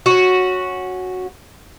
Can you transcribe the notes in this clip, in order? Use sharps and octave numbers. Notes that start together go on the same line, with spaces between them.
C#4 F#4